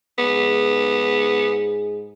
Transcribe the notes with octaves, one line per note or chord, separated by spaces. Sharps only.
G#2 G#3 B3 G#4